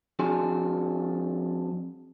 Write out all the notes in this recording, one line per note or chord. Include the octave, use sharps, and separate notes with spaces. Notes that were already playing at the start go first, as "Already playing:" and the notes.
F2 D4 F#4 G#4 G#5 C6